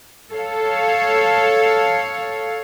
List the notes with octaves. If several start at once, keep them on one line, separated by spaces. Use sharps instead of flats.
A4 C#5 F5